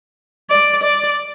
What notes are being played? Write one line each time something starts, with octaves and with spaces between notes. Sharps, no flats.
D5
D5